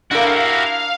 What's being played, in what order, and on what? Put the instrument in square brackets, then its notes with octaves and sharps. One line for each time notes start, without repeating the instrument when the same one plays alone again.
[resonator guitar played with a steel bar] D4 A#4 [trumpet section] E4 [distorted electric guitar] F#4 G4 [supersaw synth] F5